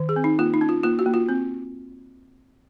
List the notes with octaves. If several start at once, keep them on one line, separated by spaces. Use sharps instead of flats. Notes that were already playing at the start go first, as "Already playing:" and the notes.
Already playing: D#3
G#4
C4
D#4
A#3 F4
D#4
C#4
F4
A#3 F4
F#4
A#3
F4
C4